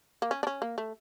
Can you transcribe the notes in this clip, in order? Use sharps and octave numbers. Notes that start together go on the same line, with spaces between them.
A#3
C#4
D4
C#4
A#3
A3